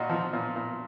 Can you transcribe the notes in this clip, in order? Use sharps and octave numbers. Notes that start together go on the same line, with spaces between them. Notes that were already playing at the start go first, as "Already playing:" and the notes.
Already playing: A#2 D#4 F#4
F3
A#2
A#2